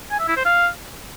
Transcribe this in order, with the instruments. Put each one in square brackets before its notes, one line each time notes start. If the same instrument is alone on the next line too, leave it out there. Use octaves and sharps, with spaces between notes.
[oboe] G#5
E5
E4
C5
F5